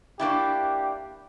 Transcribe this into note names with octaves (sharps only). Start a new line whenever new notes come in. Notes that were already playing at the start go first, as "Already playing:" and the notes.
A#3 D4 E4 G4